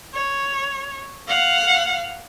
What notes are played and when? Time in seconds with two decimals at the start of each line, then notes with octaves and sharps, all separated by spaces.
0.14 C#5
1.27 F5 F#5